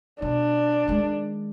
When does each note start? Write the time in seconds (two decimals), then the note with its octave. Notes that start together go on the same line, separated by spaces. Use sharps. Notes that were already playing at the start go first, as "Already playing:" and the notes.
0.22 B2 D4
0.88 D#3 G#3